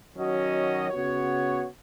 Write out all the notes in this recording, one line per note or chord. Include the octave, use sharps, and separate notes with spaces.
D#3 F#3 C#4 F#4 D#5
C#3 B3 F#4 C#5